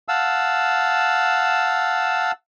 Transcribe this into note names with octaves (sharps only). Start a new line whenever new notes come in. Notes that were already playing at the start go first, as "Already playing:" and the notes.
F5 F#5 A5 E6